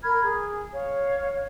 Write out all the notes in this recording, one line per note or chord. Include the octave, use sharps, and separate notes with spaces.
A#4 B5 F6 G#6
G#4
C#5 F5